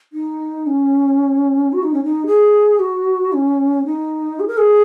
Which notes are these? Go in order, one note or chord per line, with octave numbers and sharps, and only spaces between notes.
D#4
C#4
F#4
D#4
C#4
D#4
G#4
F#4
C#4
D#4
G#4
A#4
G#4